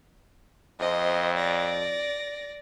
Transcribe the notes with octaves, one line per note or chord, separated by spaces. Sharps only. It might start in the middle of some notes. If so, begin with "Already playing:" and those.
F2 C5 D#5
D5 A#6